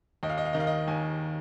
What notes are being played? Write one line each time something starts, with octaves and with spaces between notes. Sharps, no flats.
D#2 D#5
F5
D#5
F5
D#3 D#5
F5
D#5
D#2 G#5